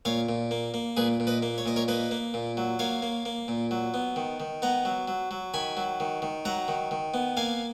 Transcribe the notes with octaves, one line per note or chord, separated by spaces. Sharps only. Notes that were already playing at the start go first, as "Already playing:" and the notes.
A#2 C#5 F5
A#2
A#3
A#3
A#2 G#4 B4
A#2
B4 D#5
A#3
C#5
A#2 D#5
A#4 C#5
A#3 B4 D#5
A#3
A#2
F#3
A#3 C#5 F5
A#3
A#3
A#2
F#3
B3
D#3
D#3
B3 F#5 A#5
F#3
F#3
F#3
D#3 G#5 B5
F#3
D#3
D#3
F#3 F#5 A#5
D#3
D#3
B3
A#3 F5 G#5